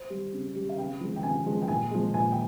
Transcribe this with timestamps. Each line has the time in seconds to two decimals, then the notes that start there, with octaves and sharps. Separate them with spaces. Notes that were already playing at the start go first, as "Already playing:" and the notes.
Already playing: C5
0.10 G3
0.33 C#3
0.55 G3
0.69 F5
0.78 C#3 G5
1.01 F3 G#3
1.16 G5
1.23 C#3 G#5
1.46 F3 G#3
1.62 G5
1.68 A#2 G#5
1.91 F3 G#3
2.14 A#2 G#5
2.32 G5